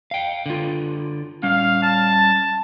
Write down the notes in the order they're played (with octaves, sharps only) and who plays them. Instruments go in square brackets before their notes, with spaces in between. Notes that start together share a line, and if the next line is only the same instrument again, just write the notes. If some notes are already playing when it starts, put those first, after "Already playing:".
[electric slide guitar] F5 G5
D3 F4
[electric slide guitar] G3 C#4 [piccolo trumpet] F5
[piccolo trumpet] A5